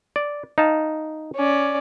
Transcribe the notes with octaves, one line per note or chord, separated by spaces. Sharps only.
D5
D#4 F5 A5
C#4 D5